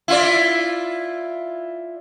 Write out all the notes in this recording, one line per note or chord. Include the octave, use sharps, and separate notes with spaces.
E4 F4 D5